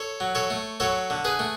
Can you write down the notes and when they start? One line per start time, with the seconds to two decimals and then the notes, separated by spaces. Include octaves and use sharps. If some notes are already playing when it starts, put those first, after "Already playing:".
Already playing: A4 C#5
0.20 F#3
0.35 A4 C#5
0.50 A3
0.80 F#3 A4 C#5
1.10 D3
1.25 G#4 B4
1.39 A3